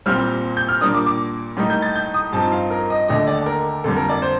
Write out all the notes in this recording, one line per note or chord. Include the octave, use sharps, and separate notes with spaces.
C2 A#2 G3 C4 F6
G6
F6
A#2 G3 A#3 D4 D#6
D6
D6
A2 G3 A#3 D#4
G6
A6
G6
D#6
G2 F3 C4 D#4 A5
F5
A#4
D#5
D#2 D3 A3 D4 D#5
D5
A#4
F2 D3 G3 A#3 A4
A#4
D5
C5